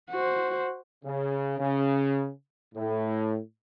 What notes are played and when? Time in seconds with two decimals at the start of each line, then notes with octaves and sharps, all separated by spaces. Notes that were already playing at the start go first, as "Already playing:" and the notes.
0.11 F#4 C5
1.05 C#3
1.59 C#3
2.75 A2